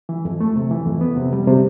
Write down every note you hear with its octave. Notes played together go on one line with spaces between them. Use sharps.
E3
F2
A3
C3
E3
F2
B3
C3
G3
C3